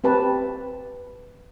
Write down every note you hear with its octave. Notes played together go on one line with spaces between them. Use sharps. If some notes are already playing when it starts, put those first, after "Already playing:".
C4 G4 B4 A5